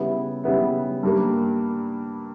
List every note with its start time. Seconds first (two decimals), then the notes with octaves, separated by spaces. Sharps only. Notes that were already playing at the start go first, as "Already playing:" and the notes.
Already playing: C#3 G3 B3 E4
0.44 C#3 G3 B3 E4
1.03 G2 G3 A#3